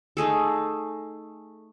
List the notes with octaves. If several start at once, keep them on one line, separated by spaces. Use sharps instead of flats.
A3 D#4 G#4 A4